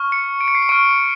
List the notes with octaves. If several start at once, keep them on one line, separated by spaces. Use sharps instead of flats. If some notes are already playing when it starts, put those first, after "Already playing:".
Already playing: C#6 F6
C#7
D7
C#7
C7
C#7
C#6 F6 D7